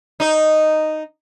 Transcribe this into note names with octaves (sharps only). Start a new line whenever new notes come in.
D#4 D#5